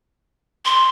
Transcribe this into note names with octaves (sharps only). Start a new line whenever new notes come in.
C6